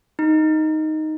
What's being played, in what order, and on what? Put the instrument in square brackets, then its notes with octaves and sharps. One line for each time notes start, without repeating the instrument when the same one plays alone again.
[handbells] D#4